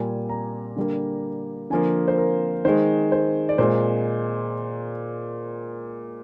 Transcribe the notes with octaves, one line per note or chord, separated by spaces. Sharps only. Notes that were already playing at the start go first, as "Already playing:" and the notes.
Already playing: A#2 G3 A#3 G#5
A#5
D3 G3 A#3
D3 F3 A#3 G#5
C5
A#4
D#3 G#3 C5
C5
D5
A#2 G#3 C5